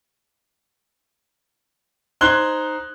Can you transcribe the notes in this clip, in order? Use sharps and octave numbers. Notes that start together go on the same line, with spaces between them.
D#4 C5 C6 F#6 G#6 G7